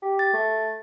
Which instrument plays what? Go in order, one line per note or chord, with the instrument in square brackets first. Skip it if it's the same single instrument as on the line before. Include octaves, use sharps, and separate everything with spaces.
[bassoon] G4
[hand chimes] A6
[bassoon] A3